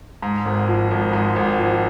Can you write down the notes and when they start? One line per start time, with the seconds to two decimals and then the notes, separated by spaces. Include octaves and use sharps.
0.22 G#2
0.45 G#1
0.68 F3
0.91 G#1
1.13 G#2
1.36 G#1
1.59 F3